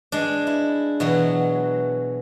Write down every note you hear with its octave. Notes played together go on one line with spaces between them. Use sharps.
G#3 D4
E4
B2 E3 F#3